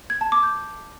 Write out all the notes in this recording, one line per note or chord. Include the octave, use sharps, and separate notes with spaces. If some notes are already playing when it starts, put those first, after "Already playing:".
G#6
A5
D6
G6